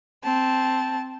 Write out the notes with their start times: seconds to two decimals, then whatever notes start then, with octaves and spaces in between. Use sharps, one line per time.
0.23 C4 A5